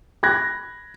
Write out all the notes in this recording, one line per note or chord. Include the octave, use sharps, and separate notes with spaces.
B5 F#6 G#6 A#6